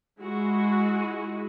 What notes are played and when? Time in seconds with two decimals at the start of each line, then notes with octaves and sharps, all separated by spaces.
0.20 G#3 E4 F#4